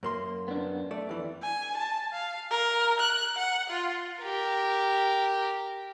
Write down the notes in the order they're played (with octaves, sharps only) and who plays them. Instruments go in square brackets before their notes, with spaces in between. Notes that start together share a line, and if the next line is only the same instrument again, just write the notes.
[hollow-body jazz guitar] F#2 A#3 C6
[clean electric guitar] B3 D4
[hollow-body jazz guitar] A3 [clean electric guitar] D5
[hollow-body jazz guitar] F2 E3
[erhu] G#5
A5
F5
A#4
F#6
F#5
F4
[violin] G4 A#4